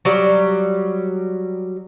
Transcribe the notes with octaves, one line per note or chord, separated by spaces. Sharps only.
F#3 G3